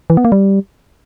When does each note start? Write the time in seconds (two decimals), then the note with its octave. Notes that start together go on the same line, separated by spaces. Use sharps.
0.10 E3
0.17 B3
0.25 A#3
0.32 G3